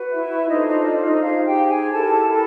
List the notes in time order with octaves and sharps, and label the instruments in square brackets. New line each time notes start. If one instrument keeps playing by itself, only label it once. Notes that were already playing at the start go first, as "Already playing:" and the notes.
Already playing: [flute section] F#4 B4
E4 E5
D4 D#4 F4 A4 C5 D#5
D#4 D#5
D5
D#4 D#5
D#4 F4 G#4 C5 F5
G4 G5
G#4 G#5
E4 G4 A4 A#4 A5
A4 A5